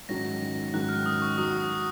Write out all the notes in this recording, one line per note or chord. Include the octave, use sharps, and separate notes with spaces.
G#2 D#3 F#3 C#4 F#4 A#6
G#2 D#3 F#3 C#4 F#4 F#6
F6
D#6
C#6
F#3 D#6